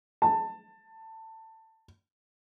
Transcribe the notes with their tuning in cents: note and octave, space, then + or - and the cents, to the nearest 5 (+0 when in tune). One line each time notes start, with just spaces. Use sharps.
A5 +20